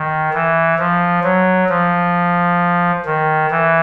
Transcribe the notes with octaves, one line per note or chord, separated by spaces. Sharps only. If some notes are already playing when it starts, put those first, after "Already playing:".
Already playing: D#3
E3
F3
F#3
F3
D#3
E3